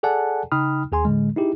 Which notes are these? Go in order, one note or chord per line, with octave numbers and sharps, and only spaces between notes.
G#4 A4 D5 F#5 G#5 A5
C#3 D#4 G5 B5 D#6 F6
D#2 G#4 G#5 C6
A2 D3 G#3
D#4 E4 G4 G#4